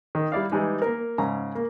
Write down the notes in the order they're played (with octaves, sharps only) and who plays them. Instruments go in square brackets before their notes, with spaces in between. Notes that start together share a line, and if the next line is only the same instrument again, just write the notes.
[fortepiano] D#3
G3 E4 D5 F5
E3 G3 G#3 D#4
A#3 A#4
G#2 C#3 A#5
A#3